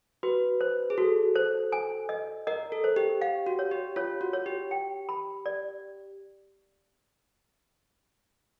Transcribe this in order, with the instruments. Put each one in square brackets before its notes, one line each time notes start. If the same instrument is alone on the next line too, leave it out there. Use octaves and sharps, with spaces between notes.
[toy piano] F#4 [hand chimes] B4
[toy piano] C5
[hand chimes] G#4
[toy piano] F#4 [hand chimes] A4
[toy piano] C5
G#5
D#5
[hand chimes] A#4 [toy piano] D#5
[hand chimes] A4
[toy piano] C5
[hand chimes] G4
[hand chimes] G4 [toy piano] F5
[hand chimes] F#4
[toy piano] C#5
[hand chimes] G4
[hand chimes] F4 [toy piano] C#5
[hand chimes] F#4
[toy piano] C#5
[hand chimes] G4
[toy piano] G5
B5
D5